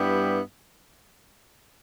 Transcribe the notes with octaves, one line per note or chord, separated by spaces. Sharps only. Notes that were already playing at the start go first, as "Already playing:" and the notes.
Already playing: G2 G3 B3 E4 G4